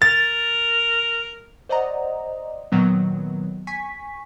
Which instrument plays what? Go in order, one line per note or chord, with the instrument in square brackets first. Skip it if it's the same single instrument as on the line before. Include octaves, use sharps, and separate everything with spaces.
[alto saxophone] A#4 [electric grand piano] A6
[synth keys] C5 D5 D#5 F#5 A#5
A#2 D#3 F#3 B3
G#5 C#6 B6